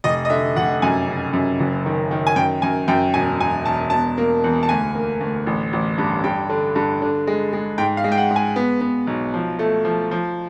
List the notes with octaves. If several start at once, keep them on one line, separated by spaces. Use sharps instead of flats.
F1 D#5
D#5
D3 E5
F1 F#5
F#2 G#5
C#3
F#2
F#1
D#3
D#3
G#5
F#2 G5
F#2 G#5
F#2 G5
E1 G#5
E1 G#5
E1 A5
B2 A5
A#3
E2
A5
D2 G#5
A#3
D2
A1
A1
G2
G2 G5
D3
G2
D3
G#3
G#3
G#2 G5
F5
G#3
G5
F#5
G#3
G#5
B3
B3
B1
F3
A3
F3
F3